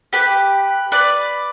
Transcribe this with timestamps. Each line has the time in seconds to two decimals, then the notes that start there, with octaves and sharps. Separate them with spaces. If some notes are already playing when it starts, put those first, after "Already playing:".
0.13 G4 B4
0.92 B4 D5